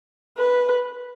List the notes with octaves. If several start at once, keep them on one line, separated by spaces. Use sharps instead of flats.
B4